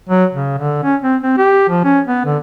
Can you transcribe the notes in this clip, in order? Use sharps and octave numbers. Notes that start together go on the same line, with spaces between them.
F#3
C#3
D3
C#4
C4
C4
G4
F3
C#4
B3
D3